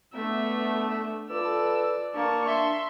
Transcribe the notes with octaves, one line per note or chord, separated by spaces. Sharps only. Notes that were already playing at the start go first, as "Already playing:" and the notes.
A3 B3 D4 E5
F4 A4 B4 D5 E6
A#3 D4 A5 C#6
E5 C6